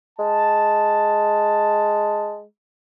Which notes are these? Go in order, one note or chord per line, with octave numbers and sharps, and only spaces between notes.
G#3 A5